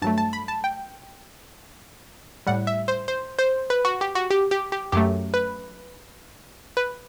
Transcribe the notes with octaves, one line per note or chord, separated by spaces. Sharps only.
G2 F#3 A3 A5
A5
B5
A5
G5
A2 G3 F#5
E5
C5
C5
C5
B4
F#4
G4
F#4
G4
G4
G4
F#2 F#3 A3 G4
B4
B4